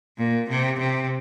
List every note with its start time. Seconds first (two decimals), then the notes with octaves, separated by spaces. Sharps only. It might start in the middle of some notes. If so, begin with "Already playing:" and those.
0.18 A#2
0.49 C3
0.79 C3